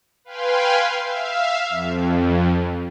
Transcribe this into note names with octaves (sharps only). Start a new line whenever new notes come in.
B4 F5 G5 G#5 C6
E5 F5
F2